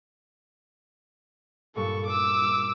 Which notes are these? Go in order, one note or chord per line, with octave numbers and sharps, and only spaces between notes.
G2 A#2 A4 C#6
D6 E6